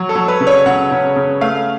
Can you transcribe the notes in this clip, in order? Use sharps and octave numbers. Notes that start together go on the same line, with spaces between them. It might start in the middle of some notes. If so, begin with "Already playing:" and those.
Already playing: F#3
A4
F#3
B4
C#3
C#5
C#3 F#5
C#3
C#3
A3 F5